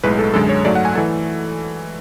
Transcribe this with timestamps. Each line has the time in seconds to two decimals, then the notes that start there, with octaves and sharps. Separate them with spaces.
0.04 B1 A2 G#3 B4
0.19 A4
0.34 F#2 D3 G#3 A4
0.49 C#5
0.65 G#2 F#3 A3 D5
0.75 F#5
0.85 G#5
0.95 E3 A3 A4